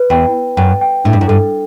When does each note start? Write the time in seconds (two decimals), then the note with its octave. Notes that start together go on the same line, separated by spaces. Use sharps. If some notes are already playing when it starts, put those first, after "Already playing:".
Already playing: B4
0.10 E2 G5
0.33 G5
0.57 F#2 G5
0.81 G5
1.04 A2 D4
1.13 G2
1.21 F#2
1.28 G2 A4